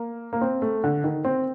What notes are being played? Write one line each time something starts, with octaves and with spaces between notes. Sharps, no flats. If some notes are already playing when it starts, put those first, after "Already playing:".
Already playing: A#3
A#3
C4
A3
D3
D#3
C4